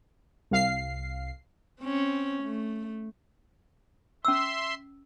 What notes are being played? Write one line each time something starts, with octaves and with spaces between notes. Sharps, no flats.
C2 F5 C7
C4 C#4
A3
C#4 E5 C6 E6